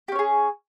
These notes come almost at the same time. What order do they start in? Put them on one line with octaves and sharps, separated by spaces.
G4 C#4 C#5 G#4